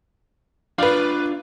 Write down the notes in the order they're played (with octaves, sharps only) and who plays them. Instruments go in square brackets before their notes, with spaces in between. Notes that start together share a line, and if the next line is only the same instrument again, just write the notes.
[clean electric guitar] D4 F4 D5 [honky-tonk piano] B4 F5